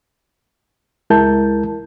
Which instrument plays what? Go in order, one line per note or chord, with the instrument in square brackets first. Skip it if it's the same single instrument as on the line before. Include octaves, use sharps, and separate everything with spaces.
[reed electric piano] C#2 G#3 E4 A#4 A5 G6